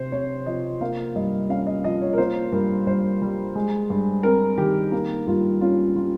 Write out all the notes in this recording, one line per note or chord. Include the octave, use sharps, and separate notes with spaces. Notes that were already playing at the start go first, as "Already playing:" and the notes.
Already playing: C3 C4 C5
C3 C#5
F3 D#5
A#3 F5
G2 D#5
C#4 F5
D#5
F3 D#5
C#5
A#4
A#3 C5
G2 A#4
G2 C5
G3
G#3
G2
C4 A#4
D#3 G4
A#3
G2 F4
C#4 F4
G3 F4